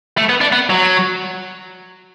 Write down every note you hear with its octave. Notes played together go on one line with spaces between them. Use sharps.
A3
B3
D4
B3
F#3